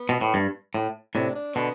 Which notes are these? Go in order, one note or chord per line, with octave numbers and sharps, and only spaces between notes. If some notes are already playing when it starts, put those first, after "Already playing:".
Already playing: B3
B2
A2
G2
A2
A2 C3 D4
D4
B2 D3 B3